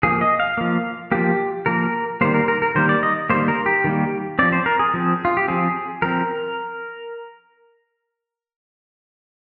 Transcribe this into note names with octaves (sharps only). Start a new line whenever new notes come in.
F3 A#3 G#4
D#5
F5
F3 A#3
F3 A#3 G4
F3 A#3 A#4
D#3 G3 A#3 C5
A#4
A#4
A#4
D#3 G3 A#3 C5
D5
D#5
D#3 G3 A#3 C5
A#4
G4
D#3 G3 A#3
F3 C4 D5
C5
A#4
G#4
F3 C4
F4
G4
F3 C4 G#4
F3 C4 A#4